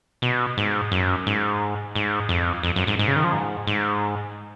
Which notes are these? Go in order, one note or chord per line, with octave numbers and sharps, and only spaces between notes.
B2
G#2
F#2
G#2
G#2
F2
F2
F#2
G#2
G#2
C#3
D#3
F3
G#2
G#2